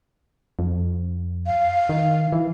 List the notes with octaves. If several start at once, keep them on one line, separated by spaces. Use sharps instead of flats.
F2
F5
D#3
E3